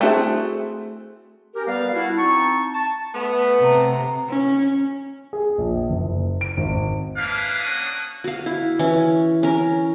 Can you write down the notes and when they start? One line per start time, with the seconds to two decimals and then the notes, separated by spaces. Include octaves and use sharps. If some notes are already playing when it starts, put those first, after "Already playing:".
0.01 A3 C4 E4 F#4 G#4
1.55 C#4 G4 A#4
1.67 G3 B3 B4 D5 F5
1.94 D4 E4 F#4
2.17 C4 D#4 A5 C#6
2.73 A5
3.15 A3 B3
3.60 C3 A#5
4.29 C#4
5.33 G#4
5.58 A#1
5.90 F#1
6.41 D7
6.57 G#1
7.17 A#3 C#4 D4 E4 B4 F5
7.60 A#3 C#4 D4 F#4 F#5 D#6
8.24 F#4 F5
8.46 E4
8.79 E3 C#4
9.43 C#4 A#4